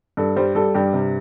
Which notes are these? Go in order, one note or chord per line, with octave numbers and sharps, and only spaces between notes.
G2 A4
G3 C5
G3 A4
G2 G4
C3